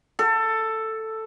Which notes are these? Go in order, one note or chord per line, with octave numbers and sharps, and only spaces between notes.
A4